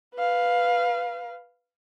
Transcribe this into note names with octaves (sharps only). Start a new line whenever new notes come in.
B4 F5